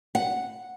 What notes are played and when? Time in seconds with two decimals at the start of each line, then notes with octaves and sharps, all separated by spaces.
0.15 F#5